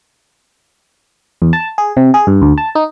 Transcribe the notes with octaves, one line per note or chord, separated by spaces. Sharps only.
E2
A5
G#4
C3
G#4
G2
D2
A5
D#4